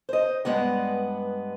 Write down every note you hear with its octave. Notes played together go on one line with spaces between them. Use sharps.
C5 D#5
G2 G#3 B3 F#5